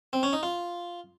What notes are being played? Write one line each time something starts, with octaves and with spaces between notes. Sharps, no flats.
C4
C#4
D#4
F4